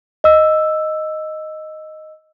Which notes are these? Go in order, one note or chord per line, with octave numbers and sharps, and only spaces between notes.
D#5 E6